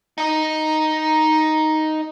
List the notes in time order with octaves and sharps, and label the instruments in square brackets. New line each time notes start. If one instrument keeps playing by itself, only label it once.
[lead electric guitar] D#4 D#5